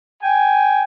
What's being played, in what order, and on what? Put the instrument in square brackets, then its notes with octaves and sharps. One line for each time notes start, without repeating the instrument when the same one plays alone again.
[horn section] G5 G#5